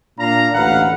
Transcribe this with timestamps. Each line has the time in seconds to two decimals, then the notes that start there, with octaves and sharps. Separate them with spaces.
0.19 A#2 D4 F5 A#5
0.54 A1 D2 B4 F5 F#5